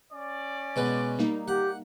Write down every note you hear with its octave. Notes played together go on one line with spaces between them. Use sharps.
C#4 D5
B2 G#3 B4
G3 A#3 D#4
G4 F#5